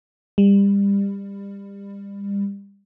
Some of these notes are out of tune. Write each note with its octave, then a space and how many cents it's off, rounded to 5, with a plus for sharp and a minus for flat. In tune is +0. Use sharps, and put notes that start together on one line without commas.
G3 +30